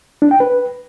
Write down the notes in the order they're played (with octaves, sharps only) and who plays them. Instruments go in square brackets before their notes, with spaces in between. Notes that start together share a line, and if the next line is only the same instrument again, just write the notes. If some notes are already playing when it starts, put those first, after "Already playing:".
[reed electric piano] D4
G5
B4